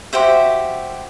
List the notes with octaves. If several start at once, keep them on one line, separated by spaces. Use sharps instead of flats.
F#4 G4 C5 E5